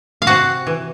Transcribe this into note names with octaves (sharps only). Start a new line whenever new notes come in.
F5
C3 F#4 F#5
E3